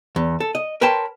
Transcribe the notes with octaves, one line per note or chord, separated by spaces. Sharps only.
E2
A4
D#5
A#4 B4 C#5 G5 A5 C6